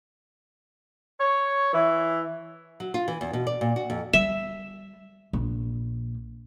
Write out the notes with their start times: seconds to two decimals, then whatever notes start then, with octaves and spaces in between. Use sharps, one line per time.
1.20 C#5
1.73 E3
2.80 F#3
2.94 F4
3.08 E3
3.21 E2
3.33 B2
3.47 D5
3.61 A#2
3.76 F#4
3.90 F2
4.13 G3 E5
5.33 A#1